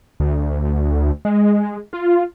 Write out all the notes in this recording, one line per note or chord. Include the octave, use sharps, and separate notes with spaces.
D2
G#3
F4